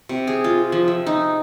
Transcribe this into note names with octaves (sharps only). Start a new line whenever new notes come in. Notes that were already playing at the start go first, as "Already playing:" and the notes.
C3
G#4
F4
F3
E5
D#4